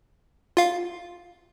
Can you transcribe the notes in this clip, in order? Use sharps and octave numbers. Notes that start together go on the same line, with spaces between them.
F4 F5